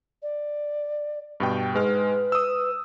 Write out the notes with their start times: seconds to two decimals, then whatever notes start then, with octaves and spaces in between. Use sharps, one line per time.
0.22 D5
1.40 G2 B2 G5
1.74 G#2 G#3 B4 F6
2.32 D#6 E6